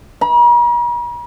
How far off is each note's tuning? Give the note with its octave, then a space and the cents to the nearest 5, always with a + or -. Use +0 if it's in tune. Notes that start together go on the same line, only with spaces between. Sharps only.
A#5 +45